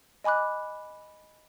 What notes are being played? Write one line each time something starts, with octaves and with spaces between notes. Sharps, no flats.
D#5 G#5 B5 D6 F#6